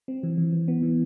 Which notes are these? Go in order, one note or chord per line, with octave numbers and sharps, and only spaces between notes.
C4
E3
E3
E3
B3
E3